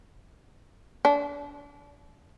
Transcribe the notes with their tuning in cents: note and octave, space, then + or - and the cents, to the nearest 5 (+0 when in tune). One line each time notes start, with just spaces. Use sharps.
D4 -30